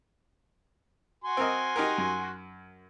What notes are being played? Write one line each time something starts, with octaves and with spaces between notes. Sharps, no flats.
F#4 G#5 C6
C4 A#4 D#5
D#4 G4 A#4
F#2